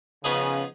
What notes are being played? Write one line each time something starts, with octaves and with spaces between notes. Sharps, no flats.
C#3 F3 B3 D#4 G#4